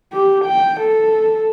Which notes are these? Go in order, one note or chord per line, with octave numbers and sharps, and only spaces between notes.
G4
G5
A4